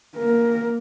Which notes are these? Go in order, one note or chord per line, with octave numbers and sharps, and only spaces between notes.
A#3 A#4